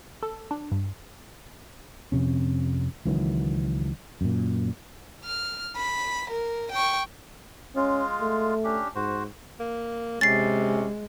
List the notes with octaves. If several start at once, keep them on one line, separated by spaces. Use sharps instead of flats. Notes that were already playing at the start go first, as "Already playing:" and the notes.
A4
D4
G2
F2 C3 C#4
C#2 D#3 E3 F#3
F#2 A#2
F6
B5
A#4
G5 C#6
G#3 C#4 F4
A3
C#4 D4 G4
G#2 F#4 C5
A#3
C3 G#3 C#4 A6 C7